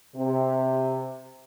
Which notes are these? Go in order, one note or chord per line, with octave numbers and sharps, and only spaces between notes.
C3